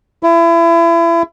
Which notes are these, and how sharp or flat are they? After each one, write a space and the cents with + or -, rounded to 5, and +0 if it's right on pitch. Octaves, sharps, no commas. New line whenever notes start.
E4 +30